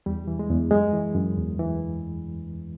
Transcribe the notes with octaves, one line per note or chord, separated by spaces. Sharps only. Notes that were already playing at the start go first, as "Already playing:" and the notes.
E2 G3
E3
G#3
E2
F#2 G#3
E3
F#2
E2
E3